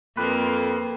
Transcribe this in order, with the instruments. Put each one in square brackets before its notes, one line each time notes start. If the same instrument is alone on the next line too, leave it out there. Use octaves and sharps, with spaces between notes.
[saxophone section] F2 [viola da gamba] A#3 [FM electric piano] B4